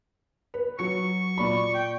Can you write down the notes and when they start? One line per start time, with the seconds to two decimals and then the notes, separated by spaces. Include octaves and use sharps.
0.54 B4
0.79 F#3 C#6 C#7
1.38 A#2 D5 B5
1.74 G5